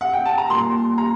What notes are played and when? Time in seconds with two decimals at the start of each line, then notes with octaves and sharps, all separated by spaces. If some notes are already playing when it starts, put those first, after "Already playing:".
0.01 F#5
0.13 G5
0.25 A5
0.38 A#5
0.50 A#2 G3 C6
0.98 A#5